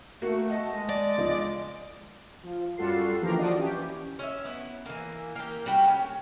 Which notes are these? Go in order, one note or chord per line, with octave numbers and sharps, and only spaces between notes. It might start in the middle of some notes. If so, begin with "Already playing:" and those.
A3 A#3 F#4 A#4
D#5 F#5 A5
G#3
D5
C#2 F3 G#3 D6
F3
F#2 G3 F4 F#4 A4 C7
D3 E3 F3 A#3 G4 A#4
F3 D4 F#4 D5 D#5
E3 C#4 G4
C#4 E5
B3 E4
E3 A#3
A#3 G4
G3 F#4 G4 G5
C#4